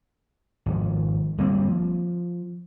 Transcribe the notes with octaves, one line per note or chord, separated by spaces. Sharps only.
G#1 F3
G1 G3 A#3 C4
F3